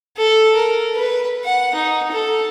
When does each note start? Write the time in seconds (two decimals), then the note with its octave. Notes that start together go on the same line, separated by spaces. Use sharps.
0.17 A4
0.55 A#4
0.94 B4
1.45 F#5
1.75 D#4
2.12 A4